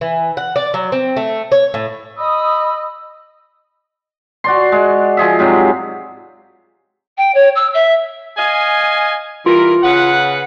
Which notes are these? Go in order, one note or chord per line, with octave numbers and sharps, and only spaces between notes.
E3
F#5
D5
F#3
C4
A3
C#5
A2
D#5 B5 D#6 E6
F#4 D5 C6
G#3
F3 G#4 E5
G#2 C3 F#3
G5
C#5
E6
E5
D#5 F5 G#5
E3 G3 F4 A#4
C#3 B4 F#5